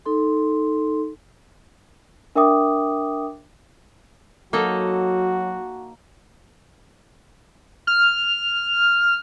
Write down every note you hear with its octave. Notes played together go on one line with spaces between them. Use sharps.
D#4 A4 C6
D4 A#4 E5 G5 D6 D#6
F#3 A#3 D#4 F#4 A4
F6